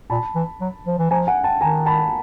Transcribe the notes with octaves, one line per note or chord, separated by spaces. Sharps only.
A#2 A5 B5
E3
F#3
F3
E3
F3 G#5 A#5
F#5 G#5
G5 A5
D#3 G#5 A#5
A5 B5